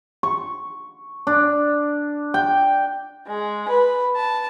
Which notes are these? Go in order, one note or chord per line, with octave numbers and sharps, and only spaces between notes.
C#6
D4
G5
G#3
B4
A5